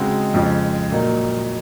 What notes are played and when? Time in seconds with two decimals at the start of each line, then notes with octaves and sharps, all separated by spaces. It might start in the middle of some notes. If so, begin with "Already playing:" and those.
Already playing: C#3 G#3 C4 D#4 F#4
0.34 F2 C#3 F3 G#3
0.92 A#2 F#3 A#3 D#4